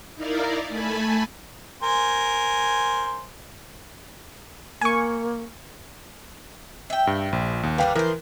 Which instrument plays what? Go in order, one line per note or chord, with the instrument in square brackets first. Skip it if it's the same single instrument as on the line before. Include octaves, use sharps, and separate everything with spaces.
[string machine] D#4 E4 A#4 D5 F5
A3 G#5 A5 B5
[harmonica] A#4 C5 G#5
[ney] A#3 [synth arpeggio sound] G#5 C#6
[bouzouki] E5 G5
[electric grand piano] G2
A#1
D#2
[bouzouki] D3 G3 D4 [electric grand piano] B4 F5 G5
[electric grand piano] E3 A#4 [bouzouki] F3 C5